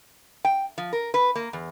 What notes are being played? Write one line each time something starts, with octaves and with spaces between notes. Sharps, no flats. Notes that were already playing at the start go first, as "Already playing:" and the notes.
G5
F3
A#4
B4
A#3
E2